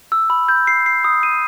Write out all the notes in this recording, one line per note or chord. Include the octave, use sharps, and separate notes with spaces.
E6
B5
G6
C7
C7
D#6
D#7